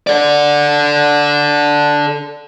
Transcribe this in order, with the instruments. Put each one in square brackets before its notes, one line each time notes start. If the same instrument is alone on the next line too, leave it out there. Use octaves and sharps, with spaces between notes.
[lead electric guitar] A4 D5